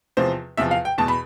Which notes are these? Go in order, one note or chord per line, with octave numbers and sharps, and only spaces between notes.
E2 C3 F3 C5
E2 C3 F3 E5
F5
G5
E2 B2 A5
B5